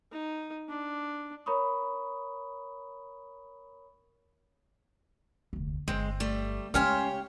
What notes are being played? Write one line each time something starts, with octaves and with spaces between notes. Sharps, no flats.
D#4
D4
A#4 C#5 A#5 B5 C#6 D#6
F1 D2
G1 G#3 C4
G3 A3
C#3 G#3 C#4 F4 G4 C5 C#5 F6